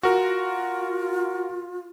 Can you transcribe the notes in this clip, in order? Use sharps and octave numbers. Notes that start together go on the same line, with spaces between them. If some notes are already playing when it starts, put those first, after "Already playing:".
F4 F#4 A#4